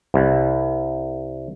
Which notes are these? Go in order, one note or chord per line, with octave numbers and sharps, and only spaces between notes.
C2